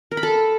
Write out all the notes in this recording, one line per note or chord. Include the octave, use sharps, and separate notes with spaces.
A#4
B5
A4